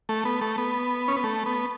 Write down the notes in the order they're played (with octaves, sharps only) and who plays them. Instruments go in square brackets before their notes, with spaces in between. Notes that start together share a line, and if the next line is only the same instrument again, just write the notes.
[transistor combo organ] A3
B3
A3
B3
C#4
B3
A3
B3